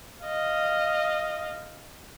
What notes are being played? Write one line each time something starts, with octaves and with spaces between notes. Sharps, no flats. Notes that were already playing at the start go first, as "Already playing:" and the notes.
D#5 F5